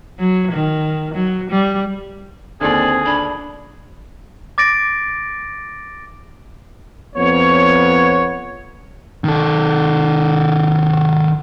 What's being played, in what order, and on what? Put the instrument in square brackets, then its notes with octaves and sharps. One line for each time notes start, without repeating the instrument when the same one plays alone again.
[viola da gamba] F#3
D#3
F#3
G3
[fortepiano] D#2 D3 [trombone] C4 [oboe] G#4 [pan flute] D5
[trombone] D4 [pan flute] B5
[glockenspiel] D6 A6 A#6 D7
[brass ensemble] F2 B3 C#5
[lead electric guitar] D#3 A4